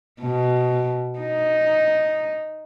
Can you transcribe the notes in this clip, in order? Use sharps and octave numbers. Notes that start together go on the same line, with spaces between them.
B2
D#4